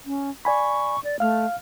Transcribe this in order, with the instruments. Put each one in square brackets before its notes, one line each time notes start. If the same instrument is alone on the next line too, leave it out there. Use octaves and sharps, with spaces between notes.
[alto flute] C#4
[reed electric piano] D5 G#5 B5 [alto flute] C#6
[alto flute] D5
[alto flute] A3 [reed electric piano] F5 F6